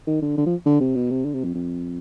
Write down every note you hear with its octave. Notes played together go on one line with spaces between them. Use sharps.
D#3
D3
D3
F3
D3
C3
B2
C3
D3
C3
F2
F2